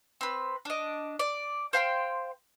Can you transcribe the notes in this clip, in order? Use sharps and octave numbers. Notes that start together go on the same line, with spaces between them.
C4 B4
D4 D#5
D5
C5 F5 G5 C6